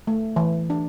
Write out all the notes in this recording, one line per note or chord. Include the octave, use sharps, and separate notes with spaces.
A3
E3
D4